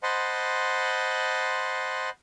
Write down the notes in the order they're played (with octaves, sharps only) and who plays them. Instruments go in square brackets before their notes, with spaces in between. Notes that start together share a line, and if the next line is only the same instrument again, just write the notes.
[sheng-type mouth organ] C5 D#5 F#5 A5 B5 C6